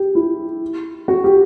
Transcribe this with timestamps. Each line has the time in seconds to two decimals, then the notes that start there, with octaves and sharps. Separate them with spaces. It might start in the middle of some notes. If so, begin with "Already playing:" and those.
Already playing: G4
0.15 E4
1.08 F#4
1.24 G4